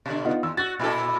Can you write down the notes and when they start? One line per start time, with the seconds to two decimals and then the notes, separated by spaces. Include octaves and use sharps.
0.06 B2 D3
0.24 B3 D#4 F4
0.43 D#2 E6
0.57 F#4 A6
0.79 A#2 E4 A4